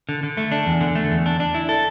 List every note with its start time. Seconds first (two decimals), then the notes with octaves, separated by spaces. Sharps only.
0.09 D3
0.23 D3
0.37 A3
0.52 D4
0.66 E2
0.81 D3
0.95 A3
1.11 E2
1.26 D4
1.40 D4
1.55 E4
1.69 A4